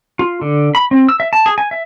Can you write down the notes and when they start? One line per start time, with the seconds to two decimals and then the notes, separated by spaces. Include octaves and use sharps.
0.19 F4
0.41 D3
0.75 B5
0.91 C4
1.09 E6
1.20 E5
1.33 A5
1.46 G#4
1.58 G#5
1.71 E5